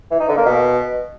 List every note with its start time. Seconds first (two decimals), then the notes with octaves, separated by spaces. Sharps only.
0.11 E3
0.20 D#4
0.28 D3
0.37 A#3
0.46 B2